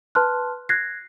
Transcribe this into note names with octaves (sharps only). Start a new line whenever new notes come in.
B4 A5 C6 F6 F#6
F#6 G#6 A#6 C7